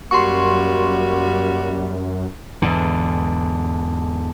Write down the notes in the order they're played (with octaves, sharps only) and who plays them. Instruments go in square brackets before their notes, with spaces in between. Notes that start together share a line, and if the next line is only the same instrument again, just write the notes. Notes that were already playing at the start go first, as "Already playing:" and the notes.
[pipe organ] F#2 [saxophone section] G3 A#3 F#4 [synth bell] C6 C#6
[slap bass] E2 G#2 D3